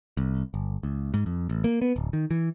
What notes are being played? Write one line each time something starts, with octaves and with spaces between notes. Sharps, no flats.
C2
G1
C#2
G#2
F2
A1
A#3
B3
D1
D#3
E3